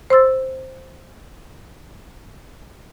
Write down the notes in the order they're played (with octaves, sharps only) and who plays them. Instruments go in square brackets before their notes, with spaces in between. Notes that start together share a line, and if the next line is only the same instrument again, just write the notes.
[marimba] C5 C6 E6 A6